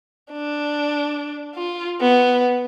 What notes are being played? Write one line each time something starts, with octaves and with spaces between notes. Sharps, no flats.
D4
F4
B3